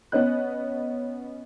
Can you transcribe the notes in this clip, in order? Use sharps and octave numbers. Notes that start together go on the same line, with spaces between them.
B3 C#4 D#5 F#6